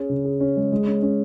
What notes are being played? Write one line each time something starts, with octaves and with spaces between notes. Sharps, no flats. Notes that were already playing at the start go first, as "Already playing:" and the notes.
Already playing: C#4 G#4
C#3
G#4
C#4
G#3
G#3
C#4
C#4